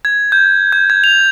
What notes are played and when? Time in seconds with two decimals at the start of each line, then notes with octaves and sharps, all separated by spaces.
0.05 G#6
0.32 G6
0.72 G6
0.90 G#6
1.04 F7